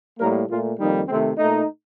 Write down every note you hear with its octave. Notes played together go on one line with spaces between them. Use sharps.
A2 G3 A#3 A#4
A#2 A3 F4
F2 D#3 G3 A#3 D#4
C3 D#3 A3 C4
A#2 A3 D#4